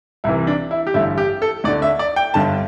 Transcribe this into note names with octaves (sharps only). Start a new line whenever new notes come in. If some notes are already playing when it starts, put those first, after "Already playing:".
C2 C3 E3 E4
D4
E4
G4
A1 G2 D3 E4
G4
A4
D2 D3 D5
E5
D5
G5
G1 G2 D3 A5